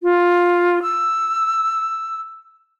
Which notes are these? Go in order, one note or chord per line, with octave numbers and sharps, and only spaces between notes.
F4
E6